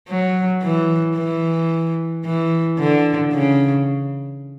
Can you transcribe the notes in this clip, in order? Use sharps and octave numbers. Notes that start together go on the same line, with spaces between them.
F#3
E3
E3
E3
D3
C#3